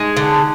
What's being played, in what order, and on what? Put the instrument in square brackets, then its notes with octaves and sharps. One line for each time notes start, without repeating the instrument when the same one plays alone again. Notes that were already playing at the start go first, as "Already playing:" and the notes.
Already playing: [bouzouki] G#3 [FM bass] D#4
[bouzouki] D3